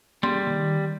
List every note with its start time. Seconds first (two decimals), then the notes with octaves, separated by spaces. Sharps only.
0.23 G3 A#3 C#4 G#4 C6
0.47 D#3 E3